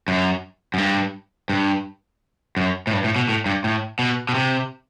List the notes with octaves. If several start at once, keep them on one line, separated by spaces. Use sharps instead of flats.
F#2
F#2
G2
G2
F#2
A2
G2
A2
B2
A2
G2
A2
B2
B2
C3